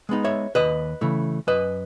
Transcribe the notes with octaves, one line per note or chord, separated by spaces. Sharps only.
G#3 B3 D#4
C#5 E5
D#2 B4 D#5
C#3 E3 A3
F#2 B4 D#5